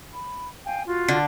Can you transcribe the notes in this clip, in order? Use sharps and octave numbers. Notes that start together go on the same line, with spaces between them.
B5
F5 G5 G#5
F4 F#4
D3